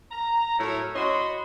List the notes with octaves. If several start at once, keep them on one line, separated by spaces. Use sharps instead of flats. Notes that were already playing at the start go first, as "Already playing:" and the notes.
A#5
A2 F#3 E4 A#4 C#5
F#4 C#5 D#5 B5 C6